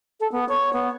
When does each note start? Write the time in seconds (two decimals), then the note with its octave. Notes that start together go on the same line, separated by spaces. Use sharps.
0.20 A4
0.32 B3
0.49 C#5
0.73 B3